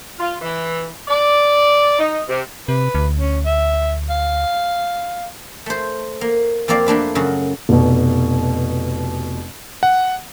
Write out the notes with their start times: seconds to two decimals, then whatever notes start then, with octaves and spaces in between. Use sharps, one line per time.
0.19 F4
0.41 E3
1.07 D5
1.98 D#4
2.28 C3
2.68 C3 B4
2.95 D2
3.19 C#4
3.46 E5
4.10 F5
5.66 A3 C5
6.21 A#3
6.68 F2 A#3 C4 D5 F5
6.87 A3 A#3 D4 B4
7.15 F#2 C#3 F#4
7.69 F1 B2
9.83 F#5